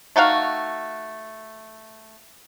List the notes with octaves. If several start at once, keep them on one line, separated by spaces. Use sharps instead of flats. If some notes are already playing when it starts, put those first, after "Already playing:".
A3 D#4 F#4 F5